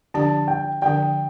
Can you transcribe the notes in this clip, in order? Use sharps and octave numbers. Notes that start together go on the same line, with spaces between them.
D3 F3 D4 G4 D5 A5
G5
D3 F3 D4 G4 D5 G5